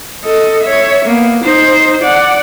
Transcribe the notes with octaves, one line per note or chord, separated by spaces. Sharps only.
A4 D#5
C#5 E5
A#3 B3
D#4 C5
D5 F#5